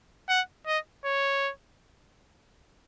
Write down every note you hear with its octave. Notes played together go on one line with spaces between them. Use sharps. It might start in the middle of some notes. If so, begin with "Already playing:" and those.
F#5
D#5
C#5